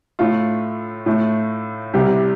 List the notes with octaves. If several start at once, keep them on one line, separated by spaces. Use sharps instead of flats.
A2 A3 F4
A2 A3
C2 C3 G3 G4